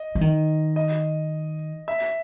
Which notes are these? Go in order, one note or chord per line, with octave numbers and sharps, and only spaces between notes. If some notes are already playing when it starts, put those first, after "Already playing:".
Already playing: D#5
E3
D#3
D#5
E5